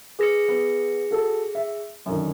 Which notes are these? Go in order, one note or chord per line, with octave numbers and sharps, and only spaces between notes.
G#4 B4 A#6 C#7
B3
F#4 A4
E5
F#2 D3 D#3